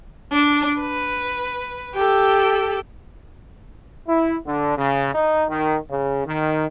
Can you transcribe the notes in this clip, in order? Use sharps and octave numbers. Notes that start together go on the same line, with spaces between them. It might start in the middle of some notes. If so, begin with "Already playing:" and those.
D4
B4
G4 A4
E4
D3
C#3
D#4
D#3
C#3
D#3